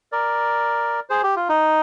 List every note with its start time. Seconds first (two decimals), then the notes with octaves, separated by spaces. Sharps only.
0.12 A#4 D5
1.10 G#4 C5
1.23 G4
1.36 F4
1.49 D#4